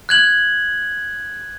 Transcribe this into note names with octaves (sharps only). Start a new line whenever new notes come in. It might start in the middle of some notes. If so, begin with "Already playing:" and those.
F#6 G#6 F#7